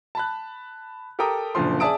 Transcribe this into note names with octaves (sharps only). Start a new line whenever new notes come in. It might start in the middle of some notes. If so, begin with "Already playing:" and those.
A5 B5 F#6
G4 A4 A#4 G5 A#5 D#6
F#1 A#2 D3 F3 C6
G#4 D5 E5 A5 D#6 D7